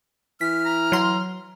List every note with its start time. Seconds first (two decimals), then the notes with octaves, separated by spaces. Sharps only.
0.41 E3 F6 B6
0.65 A#5
0.92 F#3 C6